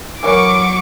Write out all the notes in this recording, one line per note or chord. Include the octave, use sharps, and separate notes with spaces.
E3 F#3 A#4 C#5 C#6 D6